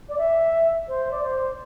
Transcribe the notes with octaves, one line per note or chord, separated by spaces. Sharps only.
D5
E5
C5
D5
C5